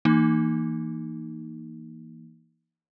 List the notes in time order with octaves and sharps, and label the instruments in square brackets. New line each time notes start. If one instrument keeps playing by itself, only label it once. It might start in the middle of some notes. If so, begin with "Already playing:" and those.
[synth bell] E3 A#3 D#4